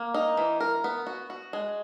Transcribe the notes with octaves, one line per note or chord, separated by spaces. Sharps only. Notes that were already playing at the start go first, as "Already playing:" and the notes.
Already playing: A#3
D#4
E3
A#4
B3
F#4
F#4
G#3